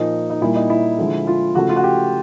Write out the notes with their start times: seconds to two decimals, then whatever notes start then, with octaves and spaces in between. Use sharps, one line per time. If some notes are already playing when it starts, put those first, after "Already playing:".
Already playing: A#2 F3 A#3 D#4
0.30 D#4
0.41 A#2 G3 A#3 E4
0.56 D#4
0.70 E4
0.98 D3 F3 G#3
1.27 F4
1.55 C#3 F3 A3 F#4
1.69 F4
1.76 F#4
1.83 G4